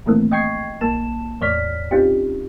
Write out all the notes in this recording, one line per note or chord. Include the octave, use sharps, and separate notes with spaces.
A#2 D#3 E3 A3 A#3 C4
D#5 G5 C#6 G#6 C7
A#1 A#3 A5 E7
E2 A2 C#5 D5 F6 B6
C4 C#4 D#4 F4 G4